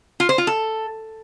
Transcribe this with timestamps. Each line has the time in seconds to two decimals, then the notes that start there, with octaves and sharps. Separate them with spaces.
0.20 F4
0.29 C5
0.38 F4
0.47 A4